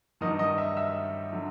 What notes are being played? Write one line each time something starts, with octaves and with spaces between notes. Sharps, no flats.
G2 D#3 F#3 D#5 D#6
D#5 D#6
E5 E6
E5 E6
D3 F#3